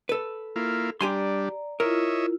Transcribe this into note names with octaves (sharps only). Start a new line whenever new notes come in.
A4 B4
A#3 E4 F4
G3 D4 G4 D5 G#5 A#5 C6
E4 F4 A#4 C#5 D#5 E5